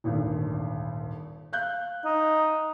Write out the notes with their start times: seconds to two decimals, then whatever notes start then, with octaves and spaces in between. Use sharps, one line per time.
0.04 D#1 G#1 D2
1.53 F5 F#6 G6
2.05 D#4